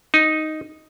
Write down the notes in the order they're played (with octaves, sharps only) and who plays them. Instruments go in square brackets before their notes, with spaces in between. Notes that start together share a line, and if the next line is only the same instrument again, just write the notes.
[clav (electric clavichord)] D#4